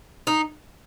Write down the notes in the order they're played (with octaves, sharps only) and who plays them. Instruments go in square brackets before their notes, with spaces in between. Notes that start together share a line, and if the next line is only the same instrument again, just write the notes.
[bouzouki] D#4